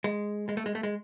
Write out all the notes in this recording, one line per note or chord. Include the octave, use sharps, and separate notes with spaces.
G#3
G#3
A3
G#3
A3
G#3